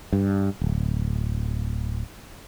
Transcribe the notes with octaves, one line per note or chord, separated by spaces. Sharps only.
G2
D1